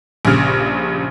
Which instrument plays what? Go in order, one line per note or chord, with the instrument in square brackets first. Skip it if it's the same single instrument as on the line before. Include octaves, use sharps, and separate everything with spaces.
[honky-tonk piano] A#1 G2 C#3 F6